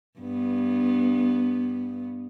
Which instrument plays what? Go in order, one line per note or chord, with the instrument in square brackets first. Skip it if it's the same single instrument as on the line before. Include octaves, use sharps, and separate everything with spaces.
[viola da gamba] G2 B3